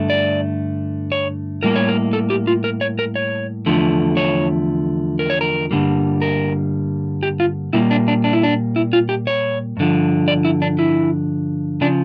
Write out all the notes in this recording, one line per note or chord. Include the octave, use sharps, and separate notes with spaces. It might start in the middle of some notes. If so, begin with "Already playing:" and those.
Already playing: G2 D3 A3
D5
C#5
A2 G3 A#3 A#4
C#5
A#4
A4
G4
F4
A#4
C#5
A#4
C#5
E2 D3 F3 A3
C#5
A#4
C#5
A#4
G2 D3 G3 A#3
A#4
G4
F4
A#2 G3 A#3 E4
D4
D4
D4
E4
D4
E4
F4
G4
C#5
G2 D3 F3
D5
E4
D4
E4
C#3 F3 D4